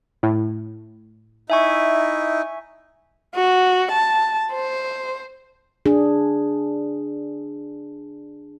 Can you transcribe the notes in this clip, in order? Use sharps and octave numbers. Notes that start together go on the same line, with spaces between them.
A2
D#4 E4 E5 G#5 C#6
F#4
A5
C5
D4 G#4